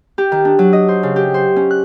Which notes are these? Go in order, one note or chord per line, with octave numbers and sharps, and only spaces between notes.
G4
D#3
D4
F#3
D#5
C5
C#3
G4
C5
C#4
F#6